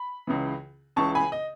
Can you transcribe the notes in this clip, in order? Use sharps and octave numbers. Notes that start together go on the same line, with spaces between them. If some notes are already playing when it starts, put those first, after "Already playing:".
Already playing: B5
C#2 C#3 E3
C#2 C#3 E3 A5 C#6
G#5 B5
D#5